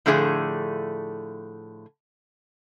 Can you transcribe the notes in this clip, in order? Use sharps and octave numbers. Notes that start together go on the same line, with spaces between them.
A2 D3 F3 A3 G#4